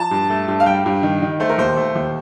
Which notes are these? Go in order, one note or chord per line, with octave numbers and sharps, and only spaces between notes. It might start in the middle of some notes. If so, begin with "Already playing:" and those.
Already playing: F3 A5
G2
A3
G2
F5
G3 G5
G2
D#3
D#3
A3 C5
A#4
D#2 C5
A3
D#2